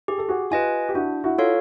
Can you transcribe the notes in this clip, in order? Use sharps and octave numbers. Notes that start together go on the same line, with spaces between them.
G4 G#4
A4
F#4 G#4
F4 G4 B4 D#5 G#5
G4
D4 E4 F#4
E4 F#4
F4 A4 C#5 F5